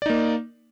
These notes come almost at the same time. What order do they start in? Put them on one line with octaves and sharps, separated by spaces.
D5 D#4 A#3